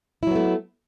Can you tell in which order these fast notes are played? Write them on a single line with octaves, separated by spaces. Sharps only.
E4 F#3 B3 A3